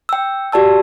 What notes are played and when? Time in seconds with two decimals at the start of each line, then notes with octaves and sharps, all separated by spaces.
0.09 G5 E6
0.52 F#4 G4 D5 A5 E6